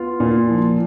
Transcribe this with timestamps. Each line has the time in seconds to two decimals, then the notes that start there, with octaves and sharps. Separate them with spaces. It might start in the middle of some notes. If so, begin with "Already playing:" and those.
Already playing: B3 F4
0.20 A#2
0.50 F3